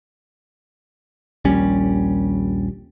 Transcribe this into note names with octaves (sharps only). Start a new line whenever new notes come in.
A#1 D#2 G3 C#4